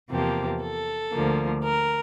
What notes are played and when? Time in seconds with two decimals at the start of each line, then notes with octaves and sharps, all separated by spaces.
0.10 E2 C3 F3 A#3 G4
0.62 A4
1.12 D2 D3 F3 A#3
1.64 A#4